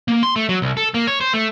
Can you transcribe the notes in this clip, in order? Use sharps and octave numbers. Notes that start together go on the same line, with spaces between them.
A#3
C6
A3
F#3
C2
A4
A#3
C#5
C5
A3